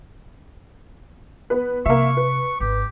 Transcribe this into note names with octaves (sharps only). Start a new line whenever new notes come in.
B3 B4
C3 A#3 E5 C#6
B4
G#1 G4